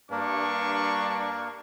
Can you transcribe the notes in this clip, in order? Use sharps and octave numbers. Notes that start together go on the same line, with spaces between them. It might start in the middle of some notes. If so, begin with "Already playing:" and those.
G2 A#3 D4 A#4 C#6